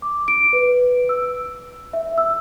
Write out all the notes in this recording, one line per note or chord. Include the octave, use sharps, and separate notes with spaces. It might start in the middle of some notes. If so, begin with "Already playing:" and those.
D6
D7
B4
E6
E5
E6